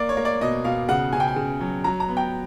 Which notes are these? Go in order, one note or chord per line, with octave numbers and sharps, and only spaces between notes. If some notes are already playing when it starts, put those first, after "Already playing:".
Already playing: A#3 D5
C#5
A#3
D5
B2 D#5
B2 F5
C#3 F#5
C#3 G#5
G5
G#5
C#3
F#3
F#3 A#5
A#5
B3
G5